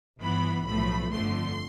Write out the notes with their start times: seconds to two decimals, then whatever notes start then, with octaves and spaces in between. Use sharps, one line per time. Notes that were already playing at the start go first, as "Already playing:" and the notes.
0.21 G1 G2 E3 B3 B5
0.66 B1 A2 F3 A3 B5
1.12 G1 F2 D3 F3 A3 C6